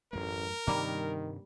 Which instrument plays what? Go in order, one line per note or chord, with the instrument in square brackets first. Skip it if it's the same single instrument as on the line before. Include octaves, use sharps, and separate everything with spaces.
[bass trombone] A1 [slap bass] F#2 A3 [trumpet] A#4
[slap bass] G2 C3 D4 [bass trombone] D#3 [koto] G3 A#3